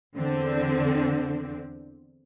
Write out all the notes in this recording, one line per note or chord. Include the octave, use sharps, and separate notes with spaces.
E2 D3 C4